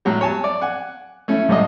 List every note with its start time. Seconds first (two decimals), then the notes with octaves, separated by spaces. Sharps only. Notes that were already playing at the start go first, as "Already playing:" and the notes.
0.05 A2 F#3 G3
0.21 C#5 G#5 A5
0.44 D5
0.61 F#5 G#5
1.28 A3 C#4 E4
1.48 C2 A2 C3 D5 D#5